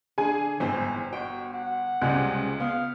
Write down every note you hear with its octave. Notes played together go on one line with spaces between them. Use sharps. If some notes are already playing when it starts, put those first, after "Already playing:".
D3 G#4 G#5
G1 G#2 E3 C4
F#4 G5
F#5
C#2 C3 G3 G#3 F#6
B3 F5